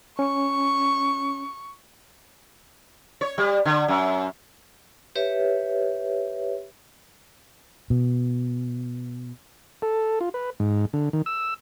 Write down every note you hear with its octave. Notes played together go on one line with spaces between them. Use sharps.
C#4 C#6
C#5
G3
D3
F#2
G4 B4 C#5 E5
B2
A4
F4
B4
G#2
D3
D#3
E6